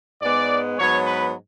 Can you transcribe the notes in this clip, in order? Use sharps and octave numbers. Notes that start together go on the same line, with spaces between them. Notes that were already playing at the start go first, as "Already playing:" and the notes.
G#2 G#3 B3 D5
G#2 F#3 B3 C#5
B4